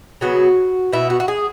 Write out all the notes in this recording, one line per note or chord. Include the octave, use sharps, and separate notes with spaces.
C#3 F#3 B3 F#4
B2 B3 E4
F#4
F#4
G#4